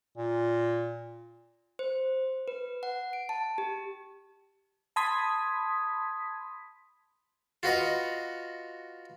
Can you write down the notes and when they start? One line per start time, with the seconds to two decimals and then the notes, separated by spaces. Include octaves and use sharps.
0.17 A#2
1.79 C5
2.48 B4
2.83 F#5
3.13 D7
3.29 A5
3.58 G4
4.96 A5 B5 C6 D#6 G#6 B6
7.63 F4 F#4 B4 D#5